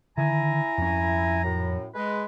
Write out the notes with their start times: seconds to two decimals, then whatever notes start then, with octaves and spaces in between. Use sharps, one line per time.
0.17 D3 D#3 E4 G#5 A#5
0.78 F2 C#4
1.44 F#2 A2
1.95 G#3 B4